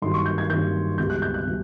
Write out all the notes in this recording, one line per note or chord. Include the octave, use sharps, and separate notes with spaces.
G2 D#3 F#3 A#3 C6
C#6
G6
G#6
G2 D#3 F#3 A#3 G6
C#2 B2 G3 G6
F#6
G6
F#6
B2 G3